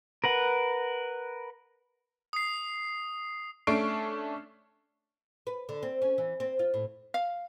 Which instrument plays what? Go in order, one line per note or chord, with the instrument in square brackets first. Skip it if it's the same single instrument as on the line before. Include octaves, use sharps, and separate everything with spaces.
[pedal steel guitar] A#4 B4 F#5
[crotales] D#6 C7
[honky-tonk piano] A3 C#4 D4 C#6 C7 D7
[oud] B4
D3
C4
C#4
E3
C4
F4
A2
[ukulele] F5